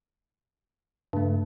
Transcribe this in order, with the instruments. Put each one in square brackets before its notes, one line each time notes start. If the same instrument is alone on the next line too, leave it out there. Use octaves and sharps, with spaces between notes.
[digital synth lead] G2 [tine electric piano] C#3 A3